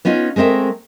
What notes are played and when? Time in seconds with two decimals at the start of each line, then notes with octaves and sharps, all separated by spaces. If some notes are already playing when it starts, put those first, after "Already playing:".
0.05 B3 C#4 D#4 F4
0.36 G#3 A3 C4 A#4 E5